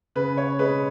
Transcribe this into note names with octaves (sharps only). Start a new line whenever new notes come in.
C#3 B4
C#5
G#3 B4